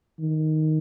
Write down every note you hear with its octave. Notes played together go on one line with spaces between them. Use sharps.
D#3